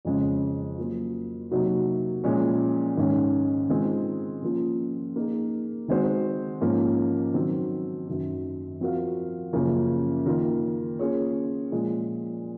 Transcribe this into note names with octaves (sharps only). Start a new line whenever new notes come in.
F2 C#3 G#3 C#4
F#3 A#3 F4
C3 F#3 A#3 D#4 F#4
A#2 F3 G#3 C#4
G#2 D#3 G#3 C#4
D#3 G#3 C4 F4 G#4
F3 A#3 C#4 F4
A#3 D#4 G#4
D#3 G#3 C4 F#4 C5
G#2 F3 A#3 C#4
D#3 F#3 C4
F#2 D#3 F#3
F3 C4 F#4 A#4 F5
F#2 C#3 F3 A#3 C#4
D#3 A#3 F4 A#4
A#3 C#4 F4 G#4 C#5
A#2 F3 G#3